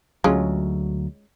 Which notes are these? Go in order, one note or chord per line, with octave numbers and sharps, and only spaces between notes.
D2 F#3 G#3 C#4 F4